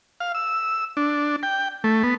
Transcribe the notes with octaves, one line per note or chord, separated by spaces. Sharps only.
F5
E6
D4
G5
A3
B3